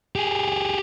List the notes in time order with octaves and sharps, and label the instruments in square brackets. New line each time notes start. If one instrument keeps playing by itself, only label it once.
[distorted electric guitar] G4 G#4